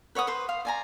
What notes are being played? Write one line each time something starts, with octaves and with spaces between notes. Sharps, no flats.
B4 C#5 F#5 D#6
B4 C5
F5
D5 G#5 A#5